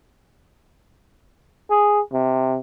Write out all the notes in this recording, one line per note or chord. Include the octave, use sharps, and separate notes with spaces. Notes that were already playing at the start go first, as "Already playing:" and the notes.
G#4
C3